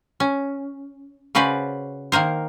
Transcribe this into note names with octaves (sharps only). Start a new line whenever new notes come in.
C#4
C#3 C#4 F#4 B4 C5 D5
D#3 A#3 A#4 C5